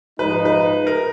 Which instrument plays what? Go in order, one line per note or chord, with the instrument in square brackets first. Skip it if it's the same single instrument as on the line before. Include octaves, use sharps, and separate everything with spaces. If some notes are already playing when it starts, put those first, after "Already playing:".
[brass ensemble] G#2 F3 G#3 D#4 [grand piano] B4
[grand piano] B4
A#4